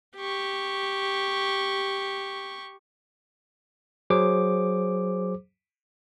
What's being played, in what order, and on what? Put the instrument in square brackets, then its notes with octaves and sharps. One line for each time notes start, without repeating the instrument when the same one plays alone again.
[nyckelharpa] G4 C#6
[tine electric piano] F#3 G#4 C5 D6